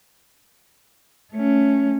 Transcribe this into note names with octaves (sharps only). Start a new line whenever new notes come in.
A3 C#4